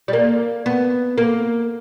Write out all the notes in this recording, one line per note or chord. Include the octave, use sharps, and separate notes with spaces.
G3
A#3
B3
A#3